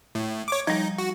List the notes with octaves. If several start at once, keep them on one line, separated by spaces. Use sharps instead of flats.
A2
C#5 D6
F3 G3 D#4
F#4